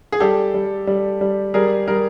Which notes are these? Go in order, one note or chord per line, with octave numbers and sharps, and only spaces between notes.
G#4
G3 G4 A4
G3
G3
G3
G3 G#4 A#4
G3 A#4